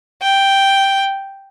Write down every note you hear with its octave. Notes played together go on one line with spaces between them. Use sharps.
G5